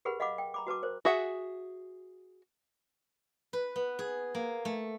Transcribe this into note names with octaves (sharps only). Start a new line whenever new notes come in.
G4 G#4 A#4 B4 F#5 B5
D#5 F5 F#5 B5 D6
G5
A#5 B5 D6
F#4 B4 A5 D6
A#4 C5
F#4 G#4 E5 F#5
B4
B3
G#4
A#3
A3